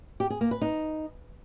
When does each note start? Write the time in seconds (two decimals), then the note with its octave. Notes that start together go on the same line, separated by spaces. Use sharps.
0.20 G4
0.30 G#4
0.41 A#3
0.51 B4
0.62 D#4